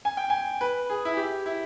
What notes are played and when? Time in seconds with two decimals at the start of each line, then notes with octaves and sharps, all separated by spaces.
0.05 G#5
0.17 G5
0.30 G#5
0.61 B4
0.90 G#4
1.05 E4
1.17 G4
1.46 E4